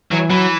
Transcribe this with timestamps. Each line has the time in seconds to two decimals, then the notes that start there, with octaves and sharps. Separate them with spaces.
0.11 E3 F#3
0.30 E3 F#3